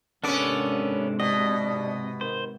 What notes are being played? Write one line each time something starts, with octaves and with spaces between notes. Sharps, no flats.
D#2 G#2 C3 B3 C#4 D4 A4 D5
B2 D4 D#5
D#3 C5